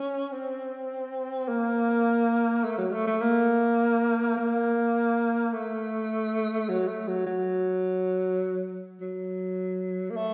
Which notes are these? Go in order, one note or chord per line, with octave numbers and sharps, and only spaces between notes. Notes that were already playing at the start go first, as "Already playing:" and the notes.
Already playing: C#4
C4
A#3
A3
F#3
A3
A3
A#3
A#3
A3
F#3
A3
F#3
F#3
F#3
A#3
A3